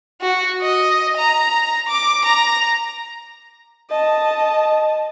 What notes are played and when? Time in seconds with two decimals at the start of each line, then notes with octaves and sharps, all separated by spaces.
0.21 F#4
0.61 D#5
1.17 A#5
1.88 D6
2.25 A#5
3.90 D#5 A5